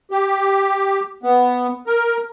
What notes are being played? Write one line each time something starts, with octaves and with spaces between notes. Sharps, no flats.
G4
B3
A#4